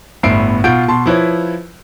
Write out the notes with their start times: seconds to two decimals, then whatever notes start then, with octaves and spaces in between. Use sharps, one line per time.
0.23 G1 A2 B3 E5 C7 D7
0.64 B2 F4 F#5 G6 D7
0.88 B2 A5 C6
1.06 F3 E4 B4 C#5